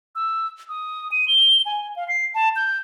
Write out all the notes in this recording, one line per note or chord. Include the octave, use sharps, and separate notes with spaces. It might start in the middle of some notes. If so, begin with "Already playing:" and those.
E6
D#6
D#7
G7
G#5
F5
C7
A5
G6